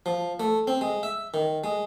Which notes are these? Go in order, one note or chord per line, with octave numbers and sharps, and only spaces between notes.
F3
A3
C4
G#3
E5
D#3
G#3